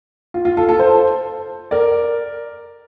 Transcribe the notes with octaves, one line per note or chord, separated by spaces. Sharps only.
F4
F4
F4 A4
F4 A4
A4 C5
A#4 D5